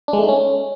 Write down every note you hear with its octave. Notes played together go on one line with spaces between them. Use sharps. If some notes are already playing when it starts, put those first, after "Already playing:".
D4
G#3
A3
D#4
C#4